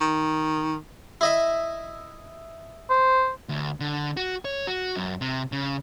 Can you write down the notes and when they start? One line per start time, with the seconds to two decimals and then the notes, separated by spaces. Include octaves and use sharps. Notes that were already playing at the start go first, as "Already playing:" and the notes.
0.01 D#3
1.21 E4 D#5 E5
2.90 C5
3.49 D2
3.80 D3
4.17 F#4
4.45 C#5
4.67 F#4
4.96 F#2
5.21 C3
5.52 C#3